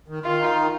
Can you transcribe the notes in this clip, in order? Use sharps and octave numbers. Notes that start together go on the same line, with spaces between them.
D#3
D#3 F4
D#4
D#3